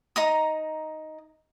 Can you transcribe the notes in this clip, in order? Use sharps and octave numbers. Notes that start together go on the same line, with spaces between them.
D#4 A#5 D#6